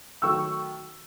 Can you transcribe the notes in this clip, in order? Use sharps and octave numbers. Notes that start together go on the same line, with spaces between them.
D#3 F#3 A3 C#6 E6